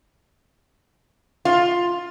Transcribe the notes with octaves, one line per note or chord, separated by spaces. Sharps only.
F4